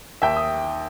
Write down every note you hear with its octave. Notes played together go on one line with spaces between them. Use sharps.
D#2 E5 G5
D#6